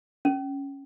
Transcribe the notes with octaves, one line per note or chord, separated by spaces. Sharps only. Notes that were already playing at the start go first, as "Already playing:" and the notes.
C#4